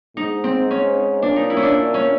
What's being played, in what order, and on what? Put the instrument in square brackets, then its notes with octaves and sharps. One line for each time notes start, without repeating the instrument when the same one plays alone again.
[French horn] G#2 [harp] D#4
[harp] C4
C#4
[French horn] A#2 [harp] D4
[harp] D#4
E4
C#4
D4
C#4